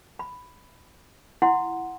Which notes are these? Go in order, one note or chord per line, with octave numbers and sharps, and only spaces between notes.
B5
E4 F#5 C6